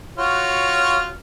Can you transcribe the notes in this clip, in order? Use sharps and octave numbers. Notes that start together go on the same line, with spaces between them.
F4 F#4 C#5